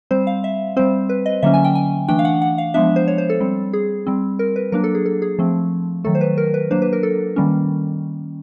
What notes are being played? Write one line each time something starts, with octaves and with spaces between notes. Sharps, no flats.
G3 C4 C5
F5
E5
G3 C4 C5
B4
D#5
D3 F#3 A#3 C#4 E5
G#5
G5
G#5
E3 A3 D4 G5
F5
F#5
F#5
F5
F3 G#3 B3 D4 E5
C5
C#5
C5
A4
G3 C4
G#4
G3 C4
A#4
B4
F#3 A#3 D4 A#4
A4
G#4
A4
G#4
F3 A3 C4
D#3 F#3 A3 A4
C5
B4
A#4
B4
F#3 A#3 D4 C5
B4
A#4
A4
D#3 G3 A#3 C#4